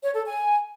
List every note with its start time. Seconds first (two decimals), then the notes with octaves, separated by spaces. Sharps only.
0.03 C#5
0.15 A4
0.26 G#5